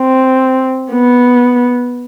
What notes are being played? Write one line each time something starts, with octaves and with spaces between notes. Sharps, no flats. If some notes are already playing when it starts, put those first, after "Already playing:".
Already playing: C4
B3